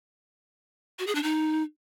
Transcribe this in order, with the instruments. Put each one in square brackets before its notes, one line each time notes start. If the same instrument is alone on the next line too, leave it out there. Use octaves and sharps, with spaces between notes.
[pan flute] F#4
G#4
D4
D#4